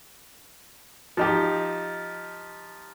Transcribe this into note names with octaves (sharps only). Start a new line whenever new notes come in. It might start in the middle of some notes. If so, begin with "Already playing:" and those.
F3 D#4 G4